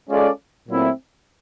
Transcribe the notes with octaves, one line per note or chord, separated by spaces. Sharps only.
G#3 C#4 F4 A4 D5
A#2 F#3 A3 C4 E4